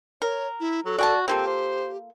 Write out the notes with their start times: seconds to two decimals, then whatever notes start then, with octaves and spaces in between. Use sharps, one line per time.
0.22 A#4 C#5
0.60 E4
0.85 F#3 A4
0.98 F#4 D5 G#5 A5
1.28 A#3 C4 F4 G4 A4
1.47 C5